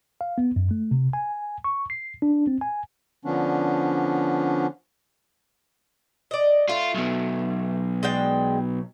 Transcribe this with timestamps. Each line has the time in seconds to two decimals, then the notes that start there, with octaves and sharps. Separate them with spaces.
0.21 F5
0.38 B3
0.56 F#2
0.71 A3
0.91 C3
1.13 G#5
1.64 C#6
1.90 C7
2.22 D4
2.47 C4
2.61 G#5
3.25 D3 F3 B3 C#4 D4
6.31 D5 D#5
6.69 A3 F4
6.95 B1 B2
8.03 G#3 D4 G5